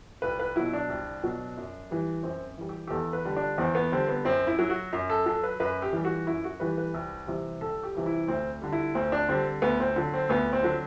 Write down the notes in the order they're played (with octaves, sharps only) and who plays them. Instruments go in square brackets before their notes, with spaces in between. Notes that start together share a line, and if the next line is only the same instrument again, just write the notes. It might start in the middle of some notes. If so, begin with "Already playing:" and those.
[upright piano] C2 B4
B4
B2 F#3 E4
D4
C2
B2 F#3
F#2
E3 G3
F#2 C4
E3 G3
G4
G4
E2 A4
B4
D3 G3
D4
E2 C4
B3
D3 G3 C4
B3
F#2 C4
E4
F#3
F#4
F#2
A4
F#3 A4
B4
F#2 B4
G4
E3 G3
F#4
F#2 E4
F#4
E3 G3 B4
B4
C2
C3 E3 G3
C2 A4
G4
C3 E3 G3
E4
D2 C4
D3 G3
E4
D2 C4
D4
D3 G3 C4
D2 B3
C4
D3 F#3
C4
D2 B3
C4
D3 F#3